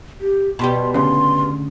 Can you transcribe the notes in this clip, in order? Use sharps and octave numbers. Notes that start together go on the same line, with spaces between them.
G4
B2 G3 G4 C6
D2 C#3 C6